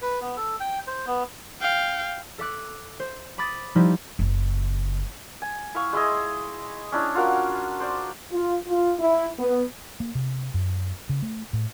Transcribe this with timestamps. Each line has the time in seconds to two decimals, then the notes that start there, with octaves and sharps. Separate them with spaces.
0.02 B4
0.21 B3
0.36 A4
0.60 G5
0.87 C5
1.07 B3
1.61 F5 G5
2.38 A4 E5 D6 F#6
3.00 C5
3.38 B5 D6 D#6 A6
3.75 F3 G3 D#4 E4
4.19 F#1 C#3
5.42 G#5
5.75 E4 F5 C#6
5.93 G#3 E4 G#4 D#5
6.92 C#4 D4 E4
7.15 F4 F#4 A#4 F5
7.80 C5 D5
8.32 F4
8.66 F4
8.99 E4
9.38 B3
10.00 A#3
10.15 C3
10.54 F#2
11.09 C#3
11.22 A3
11.53 A2